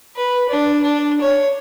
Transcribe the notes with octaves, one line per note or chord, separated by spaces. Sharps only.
B4
D4
D4
C#5